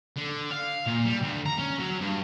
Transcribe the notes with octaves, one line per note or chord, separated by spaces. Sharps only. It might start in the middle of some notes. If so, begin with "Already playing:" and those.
D3
F5
A#2
G3
D2
A#5
C#4
F#3
G2